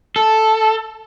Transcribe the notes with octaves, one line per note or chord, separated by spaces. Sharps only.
A4